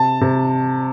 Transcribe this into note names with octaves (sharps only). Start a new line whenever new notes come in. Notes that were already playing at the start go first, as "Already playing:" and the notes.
Already playing: C3 A5
C3